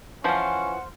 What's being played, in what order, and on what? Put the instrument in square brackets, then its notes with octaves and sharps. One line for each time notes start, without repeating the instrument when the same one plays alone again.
[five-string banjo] E3 F3 [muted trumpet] C#4 [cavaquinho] C5 F5 [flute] F#5